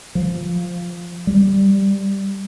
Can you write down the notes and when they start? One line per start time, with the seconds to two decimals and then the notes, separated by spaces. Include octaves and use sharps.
0.15 F3
1.27 G3